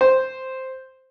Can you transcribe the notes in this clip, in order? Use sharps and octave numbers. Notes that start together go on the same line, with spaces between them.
C5